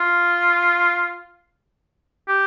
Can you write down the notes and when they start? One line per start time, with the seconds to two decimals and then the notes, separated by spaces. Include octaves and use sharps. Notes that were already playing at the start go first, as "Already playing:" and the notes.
Already playing: F4
2.29 G4